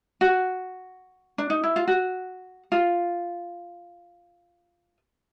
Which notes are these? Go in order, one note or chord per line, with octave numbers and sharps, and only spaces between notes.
F#4
D4
D#4
E4
F4
F#4
F4